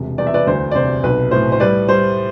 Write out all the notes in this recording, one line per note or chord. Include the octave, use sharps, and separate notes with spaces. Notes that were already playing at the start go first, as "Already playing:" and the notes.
Already playing: E1 C3
E2 D5
E5
B4 D5
D2 C5
D5
C3 C5
B1 B4
A2 C5
C5
G3 B4 D5
G3 C5